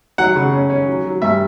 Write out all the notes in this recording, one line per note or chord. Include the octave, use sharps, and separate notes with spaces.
F#3 F#5
C#3
C#4
C#4
F#3
F#3
G2 E5